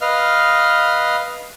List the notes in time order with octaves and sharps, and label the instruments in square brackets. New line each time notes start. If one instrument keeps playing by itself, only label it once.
[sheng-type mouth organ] B4 D#5 F5 F6